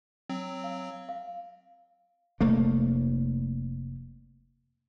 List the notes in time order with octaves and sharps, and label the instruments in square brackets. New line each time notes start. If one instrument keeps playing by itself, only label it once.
[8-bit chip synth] F#3 C4
[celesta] F5
F5
[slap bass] F1 A3 A#3